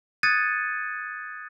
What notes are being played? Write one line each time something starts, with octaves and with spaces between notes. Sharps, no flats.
D#6 F#6 G#6 A6 C#7 D#7